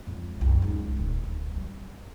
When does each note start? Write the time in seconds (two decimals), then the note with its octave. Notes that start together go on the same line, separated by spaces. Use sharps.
0.07 F2 G#3
0.41 C2 F#2
0.62 C#2 D#4
0.97 D#1 D#3
1.24 D2
1.56 G3